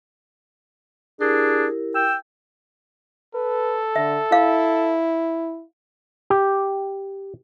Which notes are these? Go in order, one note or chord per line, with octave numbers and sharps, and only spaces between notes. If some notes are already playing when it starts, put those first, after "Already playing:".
D4 E4 G4 G#4 A#4
G5 E6
A4 B4
D3 E5
E4 F5
G4